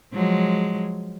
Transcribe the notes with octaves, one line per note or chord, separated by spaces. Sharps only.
F3 F#3 G#3